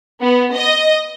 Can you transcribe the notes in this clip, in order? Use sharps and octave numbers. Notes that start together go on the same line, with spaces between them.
B3
D#5